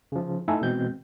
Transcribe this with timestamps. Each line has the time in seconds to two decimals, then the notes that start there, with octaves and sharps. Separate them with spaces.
0.12 C#3 F3
0.48 A3 D#4 E4 A4 G#5
0.61 B2 E3 G#3 C4 G6